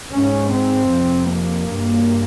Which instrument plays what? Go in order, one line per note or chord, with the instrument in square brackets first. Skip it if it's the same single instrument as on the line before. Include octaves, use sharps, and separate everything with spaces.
[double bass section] G#2 C#4
C4
F2 C3
A#3
G2